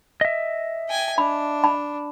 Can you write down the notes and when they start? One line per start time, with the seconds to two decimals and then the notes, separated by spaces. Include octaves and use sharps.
0.21 D#5 E5
0.88 G5 G#5
1.18 D4 B5
1.64 A5 B5